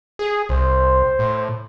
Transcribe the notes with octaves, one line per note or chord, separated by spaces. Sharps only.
G#4
C2 C5
A2